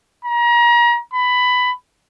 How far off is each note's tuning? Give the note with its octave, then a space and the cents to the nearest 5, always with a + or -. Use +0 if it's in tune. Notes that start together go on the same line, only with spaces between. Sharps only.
A#5 +35
B5 +15